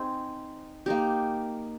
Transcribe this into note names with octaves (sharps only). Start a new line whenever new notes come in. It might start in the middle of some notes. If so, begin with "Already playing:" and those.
Already playing: C4 D#4 G#4 C5
A#3 D#4 G4